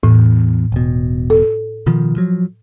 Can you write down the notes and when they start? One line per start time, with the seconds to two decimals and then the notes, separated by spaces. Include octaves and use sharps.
0.03 E2 A2
0.72 E1 B2
1.30 A4
1.86 B2 D#3 F3
2.16 F3 F#3